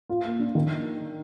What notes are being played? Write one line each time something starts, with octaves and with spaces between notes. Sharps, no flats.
F4
A#3
D4
D#3